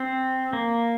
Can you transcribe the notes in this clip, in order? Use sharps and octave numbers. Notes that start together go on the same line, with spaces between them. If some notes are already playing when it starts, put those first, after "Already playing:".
Already playing: C4
A#3